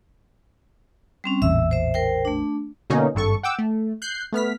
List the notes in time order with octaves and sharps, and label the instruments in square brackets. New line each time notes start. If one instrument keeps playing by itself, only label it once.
[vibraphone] G3 C4 C#4
[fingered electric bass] A1 E2 A#2 [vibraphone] E5 E6
[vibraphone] C5 E5
A#4 C5 G5
A3 D4
[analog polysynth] B2 D3 A#3 C#4 D#4
G#1 G2 A4 C#6
F#5 G5 D6 E6
A3
F#6 G6 C7
A3 B3 F6 B6